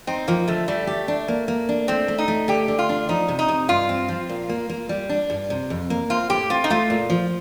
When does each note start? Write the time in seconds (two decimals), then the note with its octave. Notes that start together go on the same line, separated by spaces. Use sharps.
0.07 C4 D#4
0.28 F3 A#3
0.48 D3 A3
0.68 G3 A3
0.87 G4
1.08 D4
1.28 A#3
1.48 A#3
1.69 D4
1.88 A3 C4
2.08 A3
2.18 D#4
2.28 A3
2.48 D3 G4
2.68 D3
2.79 F4
2.89 D4
3.09 F3 D#4
3.28 C3
3.39 D#4
3.48 C3
3.68 G2 F4
3.89 C4
4.09 F3
4.29 A#2
4.49 A#3
4.69 A#3
4.89 G3
5.09 D4
5.30 G2
5.50 C3
5.70 F2
5.90 A#3
6.10 C4 F4
6.30 A2 G4
6.50 C4 F4
6.64 D#4
6.70 A3 F4
6.90 A#2
7.10 F3